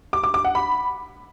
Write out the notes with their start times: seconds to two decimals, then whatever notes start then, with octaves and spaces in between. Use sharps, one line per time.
0.13 D6
0.24 D6
0.34 D6
0.45 F#5
0.55 B5